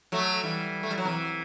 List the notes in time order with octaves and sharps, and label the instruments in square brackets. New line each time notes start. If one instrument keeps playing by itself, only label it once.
[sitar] F#3 A3
E3 G3
A3
G3
F#3
C3 E3